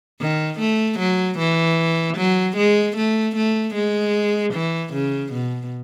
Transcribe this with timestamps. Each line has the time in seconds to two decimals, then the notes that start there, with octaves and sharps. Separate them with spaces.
0.21 D#3
0.60 A3
0.99 F#3
1.39 E3
2.17 F#3
2.57 G#3
2.96 A3
3.36 A3
3.75 G#3
4.54 E3
4.94 C#3
5.33 B2